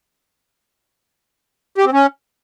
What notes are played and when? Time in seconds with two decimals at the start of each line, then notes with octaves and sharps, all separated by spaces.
1.78 G4
1.85 C4
1.93 C#4